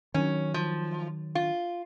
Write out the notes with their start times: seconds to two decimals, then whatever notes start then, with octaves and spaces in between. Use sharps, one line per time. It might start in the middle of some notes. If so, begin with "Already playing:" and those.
0.14 D#3 F#3 C#4
0.54 F3
1.35 F4